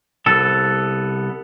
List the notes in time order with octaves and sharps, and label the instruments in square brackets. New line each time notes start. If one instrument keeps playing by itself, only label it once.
[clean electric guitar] C2 B3 A4